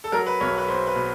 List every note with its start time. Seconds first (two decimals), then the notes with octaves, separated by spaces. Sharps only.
0.04 A4
0.12 F#3 A#4
0.27 B4
0.40 B1 C#5
0.58 B4
0.68 B1 C5
0.87 B4
0.96 B2